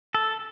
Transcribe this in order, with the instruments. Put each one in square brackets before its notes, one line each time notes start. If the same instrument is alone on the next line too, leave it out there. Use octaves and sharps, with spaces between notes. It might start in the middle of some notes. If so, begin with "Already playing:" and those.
[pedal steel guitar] A4